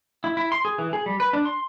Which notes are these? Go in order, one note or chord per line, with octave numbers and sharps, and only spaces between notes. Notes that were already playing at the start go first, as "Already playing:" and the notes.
E4
E4
C6
G#4
E3
G#4
G3
B4
D4
C6